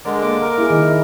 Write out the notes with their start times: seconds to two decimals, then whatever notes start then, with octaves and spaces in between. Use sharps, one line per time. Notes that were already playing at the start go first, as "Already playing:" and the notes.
0.05 D3 G#3 A#4 D5
0.22 A#3 D6
0.42 A#4
0.58 E4 G#4
0.70 D#3 D#4 E4